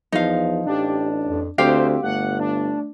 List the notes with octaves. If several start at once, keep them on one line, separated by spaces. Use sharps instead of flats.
E2 F3 D#4 F5
A1 D4 G4
F2
D2 C4 G4 C5 F5 G5
G1 A3 F#5
D4